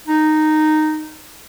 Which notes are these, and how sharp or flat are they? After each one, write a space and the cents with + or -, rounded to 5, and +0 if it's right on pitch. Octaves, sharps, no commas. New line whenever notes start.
D#4 -10